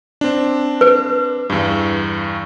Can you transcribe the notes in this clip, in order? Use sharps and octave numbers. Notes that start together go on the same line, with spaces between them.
C4 D4
B4
E2 G2